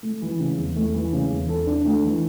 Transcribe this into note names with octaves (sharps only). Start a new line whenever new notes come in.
A3
E3
C#3
E2
A3
E3
C#3
E2
A4
D4
A3
E3